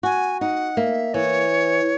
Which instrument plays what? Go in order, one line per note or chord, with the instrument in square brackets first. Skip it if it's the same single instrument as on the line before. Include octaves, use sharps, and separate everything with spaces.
[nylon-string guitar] F#4 [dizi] G#5
[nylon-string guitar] D#4 [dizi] F#5
[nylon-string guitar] A#3 [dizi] E5
[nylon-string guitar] E3 [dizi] C#5